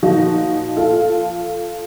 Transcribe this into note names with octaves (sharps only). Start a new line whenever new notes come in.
A#2 F3 D#4 F#4
F4 A4